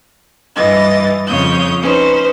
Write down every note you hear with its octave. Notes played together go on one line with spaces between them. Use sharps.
G2 E3 D#5 A6
F2 C#3 C#5 D#6 G6
C#4 D#4 B4 C5